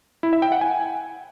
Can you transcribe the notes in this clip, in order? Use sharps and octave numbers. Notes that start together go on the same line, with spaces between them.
E4
E5
G5
F#5
G#5